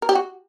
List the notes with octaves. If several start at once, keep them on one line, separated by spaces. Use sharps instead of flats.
A#4
G4
F#4